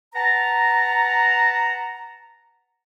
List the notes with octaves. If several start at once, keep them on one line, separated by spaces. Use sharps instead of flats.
B4 F#5 A5 A#5